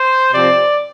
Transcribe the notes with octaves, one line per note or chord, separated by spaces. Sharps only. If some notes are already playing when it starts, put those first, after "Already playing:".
Already playing: C5
C3 F3 C4 D5